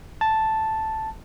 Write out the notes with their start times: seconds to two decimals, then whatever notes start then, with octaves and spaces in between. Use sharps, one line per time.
0.21 A5